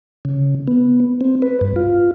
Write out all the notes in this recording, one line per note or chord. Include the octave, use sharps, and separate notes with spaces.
C#3
B3
C4
B4
G2
F4